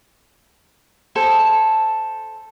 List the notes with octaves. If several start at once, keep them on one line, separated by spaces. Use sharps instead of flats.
A4 C5 G#5